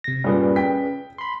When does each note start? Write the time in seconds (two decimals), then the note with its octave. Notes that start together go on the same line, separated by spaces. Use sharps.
0.04 C3 A#6
0.24 G2 A#2 C#4 G#4 B4
0.56 G5 B6
1.18 B5 C6